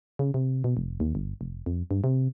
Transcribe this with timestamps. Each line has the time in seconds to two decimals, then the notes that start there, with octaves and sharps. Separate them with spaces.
0.19 C#3
0.34 C3
0.64 B2
0.77 F1
1.00 D#2
1.15 G1
1.41 F1
1.66 F2
1.91 G2
2.04 C3